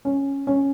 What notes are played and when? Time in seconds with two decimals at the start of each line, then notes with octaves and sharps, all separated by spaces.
0.05 C#4
0.47 C#4